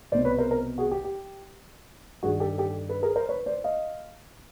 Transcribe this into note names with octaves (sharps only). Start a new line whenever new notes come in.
C2 B2 C5 D5
B4 C#5
A#4 C5
A#4 C5
F#4 G#4
G4
G4
G2 D#3 F#4 G#4
G4 A4
G4 A4
A4 B4
G#4 A#4
A#4 C5
B4 C#5
C5 D5
D#5 F5